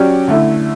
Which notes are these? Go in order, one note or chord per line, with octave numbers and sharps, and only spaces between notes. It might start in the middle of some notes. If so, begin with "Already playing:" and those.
Already playing: F#3 C#4 G4 D5
D3 A3 E4